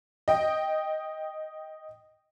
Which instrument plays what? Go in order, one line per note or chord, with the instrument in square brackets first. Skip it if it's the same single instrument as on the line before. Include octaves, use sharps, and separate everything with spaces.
[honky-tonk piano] D#5 G5